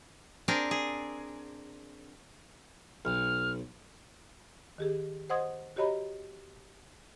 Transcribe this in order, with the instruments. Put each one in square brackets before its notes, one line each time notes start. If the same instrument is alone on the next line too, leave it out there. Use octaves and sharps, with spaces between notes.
[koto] C4 D4 G#4 A#4
G#4
[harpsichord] B1 [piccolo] F6
[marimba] D#3 G4 G#4
C5 D#5 F#5 C6 D#6 G#6
F#4 G4 C#5 D#5 A#5 B5